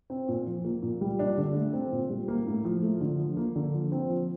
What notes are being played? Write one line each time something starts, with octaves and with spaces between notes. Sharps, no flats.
C4
A#2
F3
A#3
A#2
G3
D4
D3
A3
C4
A#2
G3
A#3
A2
F3
A3
D3
F3
A#3
D3
F3
C4
F3